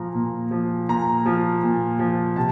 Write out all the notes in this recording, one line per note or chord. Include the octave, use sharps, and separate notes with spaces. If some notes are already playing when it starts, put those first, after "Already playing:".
Already playing: A#2 F3 A#5
A#2
F3
A#2 A#5
F3
A#2
F3
C3 A5